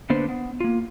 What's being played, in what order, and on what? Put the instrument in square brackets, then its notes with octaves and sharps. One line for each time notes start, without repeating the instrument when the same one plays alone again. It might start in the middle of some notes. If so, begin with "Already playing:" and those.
[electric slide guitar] D3 A#3 B3 D4 B4 C5
B3
A#3 F4